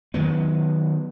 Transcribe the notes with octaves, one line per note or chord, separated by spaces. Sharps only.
D#3 F#3 B3